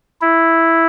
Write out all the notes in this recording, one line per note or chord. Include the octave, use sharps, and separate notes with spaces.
E4